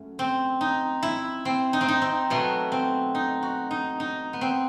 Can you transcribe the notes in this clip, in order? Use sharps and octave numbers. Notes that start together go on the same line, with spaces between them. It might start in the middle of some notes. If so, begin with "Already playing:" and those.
Already playing: F#2 A3
C4
D#4
E4
C4
D#4
C4
D#4
C4
B2 F#3 A3 B3
C4
D#4
F#4
D#4
D#4
B3
C4